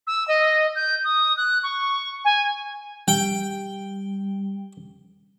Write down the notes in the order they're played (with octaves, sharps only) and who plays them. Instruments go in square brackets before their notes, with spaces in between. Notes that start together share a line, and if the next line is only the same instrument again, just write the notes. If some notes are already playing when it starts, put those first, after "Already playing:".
[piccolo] E6
D#5
G6
D#6
F#6
C#6
G#5
[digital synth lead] G3 [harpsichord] G5